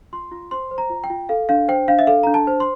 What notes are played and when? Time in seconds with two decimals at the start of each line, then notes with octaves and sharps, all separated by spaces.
0.13 F4 C6
0.32 F4
0.51 C5 C6
0.71 C5
0.78 A#5
0.90 F4
1.04 G5
1.10 F4
1.29 A4 F5
1.49 D4 F5
1.68 C5 G5
1.88 D4 F5
1.99 E5
2.07 A4 F5
2.23 D4 A#5
2.34 A5
2.47 C5
2.60 C6